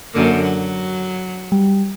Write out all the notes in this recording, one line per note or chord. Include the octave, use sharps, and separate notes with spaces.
F#2 D3 A#3
F#3
G3